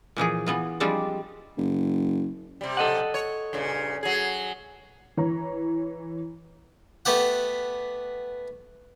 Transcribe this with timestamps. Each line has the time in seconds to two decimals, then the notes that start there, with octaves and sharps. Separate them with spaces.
0.16 A#2 E3 F3 G#4
0.46 E3 B3 F4
0.80 F3 G3 G#3 C4 D4
1.58 F#1
2.61 C3 G3
2.77 A4 D#5 F#5
3.14 C#5
3.53 G2 A#2 C#3
4.03 F#3 G#4
5.17 E3 C#5 A#5
7.05 A3 B3 G4 F#5